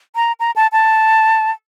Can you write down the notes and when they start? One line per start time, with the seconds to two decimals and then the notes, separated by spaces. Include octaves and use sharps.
0.16 A#5
0.40 A#5
0.56 A5
0.72 A5